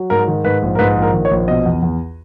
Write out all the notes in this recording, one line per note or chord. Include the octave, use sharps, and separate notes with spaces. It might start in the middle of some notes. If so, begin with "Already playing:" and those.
Already playing: F#3
G#2 A#4
D#3
G#2 B4
A#1
A#4
G#2 B4
A#1
A#4
D#3
C#5
A#1
B2 D#5
E2
E2